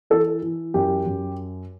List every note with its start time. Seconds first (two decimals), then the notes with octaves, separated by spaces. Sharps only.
0.10 E3 A4
0.42 E3
0.74 F#2 G4
1.06 F#2